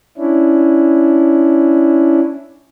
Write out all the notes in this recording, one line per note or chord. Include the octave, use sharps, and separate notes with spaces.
C#4 D4 E4